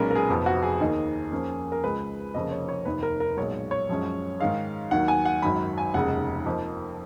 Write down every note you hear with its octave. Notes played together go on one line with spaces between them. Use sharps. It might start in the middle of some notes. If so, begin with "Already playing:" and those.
Already playing: B1 A#2 G#3 C#4 A#4 B4
A#4
G#4
F1 F2 F3 B3
F#4
G#4
D#2 D#3 A#3 D#4
F2 F3 A#3 C#4
A#4
C#2 C#3 G#3 B4
F1 F2 C#3 F3 A#3 D#5
C#5
C#5
F1 D#2 D#3 B4
A#4
A#4
B1 A#2 G#3 C#5
C#5
F#2 F3 G#3 C#4
G#2 D#3 G#3 F5
D#2 D#3 F#3 F#5
G#5
F#5
G#1 F#2 D#3 F#3 B5
G#5
F1 D#2 C#3 G#3 F#5
F2 F3 A#3 D#4